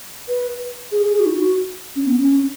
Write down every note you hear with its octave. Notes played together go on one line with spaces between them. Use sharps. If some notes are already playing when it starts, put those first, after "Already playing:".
B4
G#4
G#4
G#4
F#4
D#4
F#4
C#4
B3
C#4